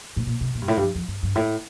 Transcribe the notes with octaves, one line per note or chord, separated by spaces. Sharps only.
A2
A#2
C3
A#2
G2
A2
G2
F2
F2
G2
G2
A2